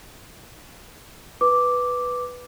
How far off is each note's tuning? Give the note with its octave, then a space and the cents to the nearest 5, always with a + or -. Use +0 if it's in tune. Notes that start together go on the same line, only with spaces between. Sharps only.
B4 +0 D6 +0